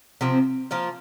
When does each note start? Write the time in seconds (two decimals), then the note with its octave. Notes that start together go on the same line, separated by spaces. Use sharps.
0.21 C3 F3 C4
0.71 F3 A#3 F4